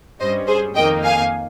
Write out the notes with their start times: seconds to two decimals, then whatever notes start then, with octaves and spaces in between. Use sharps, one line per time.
0.20 G2 G3 C#4 C5 D#5
0.47 G#4 C5
0.75 F2 D#3 A#3 D#4 D#5 G5
1.04 F5 G#5